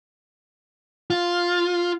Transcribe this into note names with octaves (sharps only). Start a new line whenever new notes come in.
F4